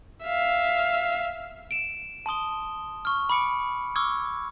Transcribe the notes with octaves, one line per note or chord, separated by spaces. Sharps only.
E5 F5
D7 E7
A5 C6 D#6 G7
C#6 F6
B5 D6 C#7 D7
C#6 D6 E6 F6 G#6